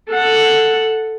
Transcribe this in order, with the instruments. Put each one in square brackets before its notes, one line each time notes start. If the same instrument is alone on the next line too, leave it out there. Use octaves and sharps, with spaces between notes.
[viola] A4 F#5